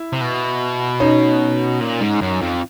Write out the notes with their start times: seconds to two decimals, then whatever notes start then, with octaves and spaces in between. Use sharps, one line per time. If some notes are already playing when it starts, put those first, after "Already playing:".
Already playing: E4
0.13 C3
0.21 B2
1.00 C#4 D#4
1.81 A#2
2.01 G#2
2.21 F#2
2.41 F2